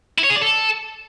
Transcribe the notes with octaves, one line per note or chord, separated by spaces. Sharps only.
E4
C#5
G#4
D5
A4